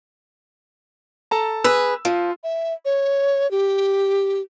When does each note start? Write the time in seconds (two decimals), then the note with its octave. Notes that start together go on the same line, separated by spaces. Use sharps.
1.31 A4 A5 A#5
1.64 G#4 B4 E6
2.05 F3 F4
2.44 E5
2.85 C#5
3.51 G4